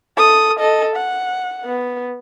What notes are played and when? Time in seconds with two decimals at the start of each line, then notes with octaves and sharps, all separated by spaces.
0.17 A4 D#6
0.59 A4 D#5
0.96 F#5
1.65 B3